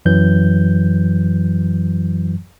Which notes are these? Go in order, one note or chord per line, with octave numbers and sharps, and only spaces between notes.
F#2 E3 F#3 G6